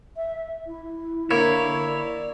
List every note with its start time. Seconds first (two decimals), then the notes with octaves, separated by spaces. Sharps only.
0.17 E5
0.67 E4
1.31 D3 A#3 E4 C#5
1.86 D5